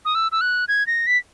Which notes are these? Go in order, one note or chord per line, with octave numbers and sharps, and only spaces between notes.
D#6
E6
E6
F#6
G#6
A#6
B6